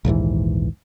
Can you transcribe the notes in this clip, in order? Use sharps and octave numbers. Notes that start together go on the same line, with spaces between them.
A#1 D#2 G#2 E3